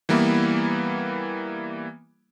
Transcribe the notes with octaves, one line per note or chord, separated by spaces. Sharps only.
E3 G3 A#3 B3 E4